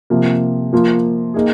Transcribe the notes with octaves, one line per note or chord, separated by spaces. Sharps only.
C3 F3 A#3
F3 A#3 F4
A#3 D#4 G#4